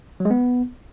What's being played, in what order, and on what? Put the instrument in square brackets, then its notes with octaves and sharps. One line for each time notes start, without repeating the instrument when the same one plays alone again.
[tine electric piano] F#3
G#3
B3